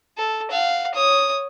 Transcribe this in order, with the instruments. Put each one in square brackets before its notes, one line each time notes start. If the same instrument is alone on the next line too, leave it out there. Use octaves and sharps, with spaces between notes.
[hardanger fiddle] A4
F5 F#5
C#5 D#6